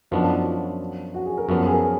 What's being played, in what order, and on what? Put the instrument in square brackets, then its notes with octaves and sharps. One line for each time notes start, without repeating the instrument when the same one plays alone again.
[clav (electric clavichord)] F#2 F3 B3 D4 [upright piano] D#4
[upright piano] F4
F#4
F#4
G#4
A#4
[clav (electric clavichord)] F#2 F3 B3 [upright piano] A#4
[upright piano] G#4
A#4